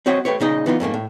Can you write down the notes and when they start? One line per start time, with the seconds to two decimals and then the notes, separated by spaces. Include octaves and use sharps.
0.06 C4 F#4 C#5 D#5 E5 F#5
0.25 A3 G4 B4 C#5
0.40 A#2 C#3 D#4 D#5
0.66 E3 B3 D#4 F4
0.80 F2 G#2 A3 A#3
0.94 A2